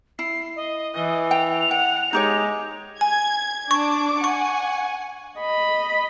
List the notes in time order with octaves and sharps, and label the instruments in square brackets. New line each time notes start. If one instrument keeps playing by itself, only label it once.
[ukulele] E4 [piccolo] C7
[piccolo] D#5
[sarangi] E3
[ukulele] G5 [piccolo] F7
[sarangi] F#5 [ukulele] G5
[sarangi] G#3 [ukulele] D#4 G4 C#5
[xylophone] G#5 [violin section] G#6
[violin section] D4 D6 [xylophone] C#6
[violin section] F#5 G#5 [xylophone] C#6
[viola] D#5 B5